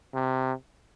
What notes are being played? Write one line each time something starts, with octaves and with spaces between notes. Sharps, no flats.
C3